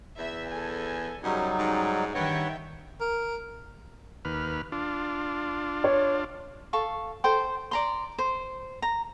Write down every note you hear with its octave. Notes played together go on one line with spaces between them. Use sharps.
E2 E5
A4 G#5
F#2 C#3 F#3 G3 D#4
G#2
G2 D#3 B4 C#5 E5 F#5 G5
A#4
D#2 B4 F6
D4 F4
C#5
A4 F5 C#6
A4 C5 G5 C6
D5 A#5 C6
C5
A#5